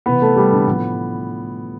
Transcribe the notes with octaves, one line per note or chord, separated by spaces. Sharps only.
C3 E3 B3 B4
A3 A4
G3 G4
D3 D4
A2 F3 B3